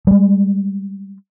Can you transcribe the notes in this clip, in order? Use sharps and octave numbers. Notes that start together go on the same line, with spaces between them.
G3 G#3